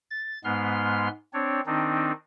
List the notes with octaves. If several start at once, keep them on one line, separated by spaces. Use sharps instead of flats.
A6
G#2 G#3 B3 C6 F6
C4 D4 C#5
D#3 C4 D4 D#4